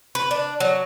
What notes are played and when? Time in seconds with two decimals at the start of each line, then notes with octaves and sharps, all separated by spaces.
0.15 B4
0.31 D4
0.60 F#3